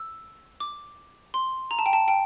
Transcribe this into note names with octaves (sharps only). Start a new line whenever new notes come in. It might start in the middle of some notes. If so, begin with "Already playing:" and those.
Already playing: E6
D6
C6
A#5
A5
G5
A5
G5